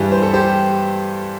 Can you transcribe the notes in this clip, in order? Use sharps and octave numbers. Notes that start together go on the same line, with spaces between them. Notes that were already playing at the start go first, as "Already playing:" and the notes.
Already playing: G2 E3 G3
C5
A4
G4 C5